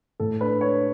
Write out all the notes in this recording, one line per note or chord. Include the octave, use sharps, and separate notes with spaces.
A2 A4
D4 B4
D4 C#5